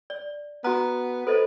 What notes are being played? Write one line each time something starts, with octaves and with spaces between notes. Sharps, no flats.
D5
B3 F#4 A#5
A4 B4 C5 D#5